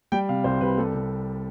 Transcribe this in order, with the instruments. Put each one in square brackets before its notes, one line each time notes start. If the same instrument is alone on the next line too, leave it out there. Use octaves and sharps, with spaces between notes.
[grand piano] G3 G5
C3 F5
C2 C5
C2 B4
G3 A4
C3